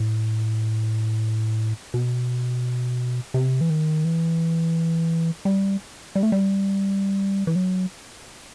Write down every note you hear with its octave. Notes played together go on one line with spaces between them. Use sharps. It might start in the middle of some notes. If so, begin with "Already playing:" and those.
Already playing: A2
B2
C3
E3
D#3
E3
G3
G3
A3
G3
E3
F#3